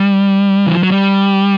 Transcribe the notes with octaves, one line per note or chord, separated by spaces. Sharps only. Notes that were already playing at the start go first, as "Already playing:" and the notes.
Already playing: G3
E3
F3
F#3
G3